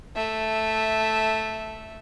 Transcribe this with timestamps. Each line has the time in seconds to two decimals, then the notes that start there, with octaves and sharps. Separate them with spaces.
0.15 A3 E5